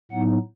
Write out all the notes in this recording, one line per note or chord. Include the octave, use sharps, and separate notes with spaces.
A2 F#3 B3 D#4 F#5